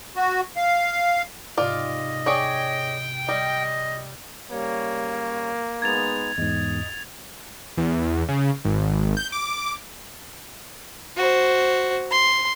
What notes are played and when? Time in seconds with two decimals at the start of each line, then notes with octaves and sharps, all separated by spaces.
0.16 F#4
0.57 F5
1.58 G#2 C3 F4 D5 D#5
2.26 G#4 C#5 D5 G5
3.29 G3 D#5
4.51 C#3 G3 A#3 C#5
5.82 G#3 B3 D#4 G#6 A6 F7
6.38 E2 G#2 D#5
7.78 E2
8.29 C#3
8.65 G#1
9.17 G6
9.32 D6
11.17 F#4 C5
12.11 C6